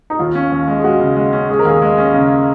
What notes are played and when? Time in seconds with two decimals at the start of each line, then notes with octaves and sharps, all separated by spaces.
0.10 D#4
0.19 D#2 F4
0.35 C#4
0.52 D#2
0.68 G#3
0.79 G#4
0.84 G#3 F#4
1.00 C#3
1.16 G#3
1.33 C#4
1.49 G#3 G#4
1.59 A#4
1.65 D#2 G#4
1.82 G#3
1.98 C#4
2.14 C#3